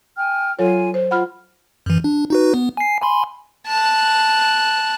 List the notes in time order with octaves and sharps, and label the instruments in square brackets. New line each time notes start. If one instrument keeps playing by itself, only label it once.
[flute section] G5 G#5 F6
[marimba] F#3 A4 C#5 [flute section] F4 G#5
[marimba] C5
[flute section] F4 [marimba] F#5 B5 F6
[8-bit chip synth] F#2 E3
D4
D#4 F#4 B4
B3
G#5 C7
G#5 B5 C6
[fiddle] A5 F#6